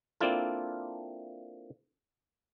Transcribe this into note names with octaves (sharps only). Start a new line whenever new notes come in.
A#3 C4 D4 E4 F4 A4